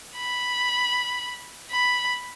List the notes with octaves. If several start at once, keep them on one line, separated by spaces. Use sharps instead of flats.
B5
B5